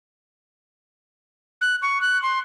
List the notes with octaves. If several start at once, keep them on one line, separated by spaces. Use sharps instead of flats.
F#6
C#6
F#6
C6